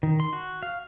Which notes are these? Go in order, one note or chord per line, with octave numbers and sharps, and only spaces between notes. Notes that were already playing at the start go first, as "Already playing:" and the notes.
D#3
C6
F#4
F5